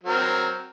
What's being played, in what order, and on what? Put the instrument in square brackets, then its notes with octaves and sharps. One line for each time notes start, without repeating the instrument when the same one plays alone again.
[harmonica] F#3
A#4
C4